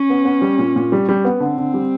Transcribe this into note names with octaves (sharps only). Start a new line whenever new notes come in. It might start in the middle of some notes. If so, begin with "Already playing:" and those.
Already playing: C#4
B3
B3
G3
A#2
A#2
G3
G3
B3
D3 C4
D3
G3